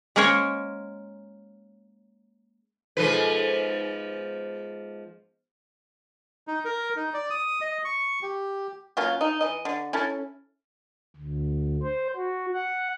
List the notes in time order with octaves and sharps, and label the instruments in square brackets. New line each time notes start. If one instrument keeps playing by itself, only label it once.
[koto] G#3 A#3 C#4 A#4 C5 C#5
[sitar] G#2 F3 B4 [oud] B2 A4
[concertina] D#4
A#4
D#4
D5
D#6
D#5
C#6
G4
[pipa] F#3 A#3 C#4 F4
D#4
E3 D#5
D3
C#4 E4 A4
[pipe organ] D2
C5
F#4
F#5